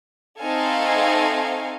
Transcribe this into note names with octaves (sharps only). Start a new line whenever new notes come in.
A3 C4 D#4 A4 F5 G#5